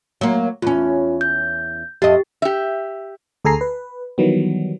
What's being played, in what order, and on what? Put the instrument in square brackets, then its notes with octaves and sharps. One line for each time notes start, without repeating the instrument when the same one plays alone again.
[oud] F#3 A#3
[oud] E2 C#4 [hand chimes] F4
[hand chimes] G6
[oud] F2 D#5 [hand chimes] G4
[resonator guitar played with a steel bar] G4 E5
[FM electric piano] D2 G#4 A4 G#5 A#5 C7
B4
D#3 E3 F#3 G3 B3